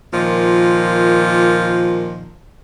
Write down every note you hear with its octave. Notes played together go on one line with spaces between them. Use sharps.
A#2 D#3 F3